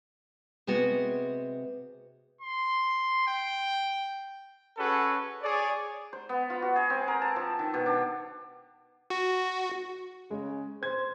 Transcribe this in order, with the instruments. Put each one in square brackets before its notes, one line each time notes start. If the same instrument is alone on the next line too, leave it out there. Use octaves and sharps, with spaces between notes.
[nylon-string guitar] C3 G#3 B3 F#4
[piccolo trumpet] C6
G5
[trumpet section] C#4 F#4 G#4 A4 B4
G#4 C#5 D5
[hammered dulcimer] C5
B3
F4
F#4
G#4
C4
A#4
A5
F3
D#3
B2
D4
[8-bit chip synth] F#4
[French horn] C#3 [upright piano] G#3
[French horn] C5 [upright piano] G#6